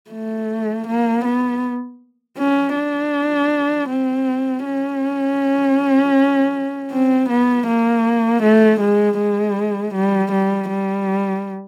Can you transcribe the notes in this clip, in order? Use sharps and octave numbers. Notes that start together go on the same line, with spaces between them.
A3
A#3
B3
C#4
D4
C4
C#4
C4
B3
A#3
A3
G#3
G#3
G3
G3
G3